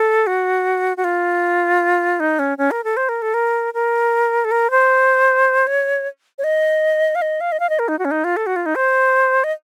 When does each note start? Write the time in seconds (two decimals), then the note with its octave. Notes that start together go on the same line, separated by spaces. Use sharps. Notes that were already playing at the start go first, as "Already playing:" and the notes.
Already playing: A4
0.27 F#4
0.97 F#4
1.04 F4
2.20 D#4
2.39 C#4
2.58 C#4
2.71 A#4
2.84 A4
2.97 C5
3.09 A#4
3.22 A4
3.34 A#4
3.74 A#4
4.45 A4
4.51 A#4
4.71 C5
5.67 C#5
6.38 C#5
6.44 D#5
7.15 F5
7.22 D#5
7.41 F5
7.52 D#5
7.60 F5
7.70 D#5
7.79 A#4
7.88 D#4
7.99 F#4
8.05 C#4
8.11 D#4
8.24 F4
8.37 A4
8.46 F#4
8.56 F4
8.66 D#4
8.75 C5
9.44 D#5